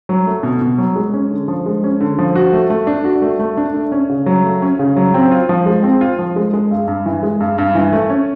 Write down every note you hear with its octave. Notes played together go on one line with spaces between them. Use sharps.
F#3
A3
B2
B2
F#3
G#3
C#4
D3
F3
G#3
C#4
D3
F3
F#4
A3
A3
D4
F#4
A3
A3
D4
A3
C#4
C#3
F#3
A3
C#4
C#3
F#3
C4
F4
F3
G#3
C4
F4
F3
G#3
G#3
G2
G2
E3
G#3
G2
G2
E3
A3
C#4